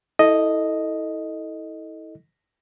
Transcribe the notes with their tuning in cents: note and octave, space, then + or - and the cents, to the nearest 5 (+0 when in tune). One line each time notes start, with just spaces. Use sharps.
E4 -30 A4 +0 D#5 +0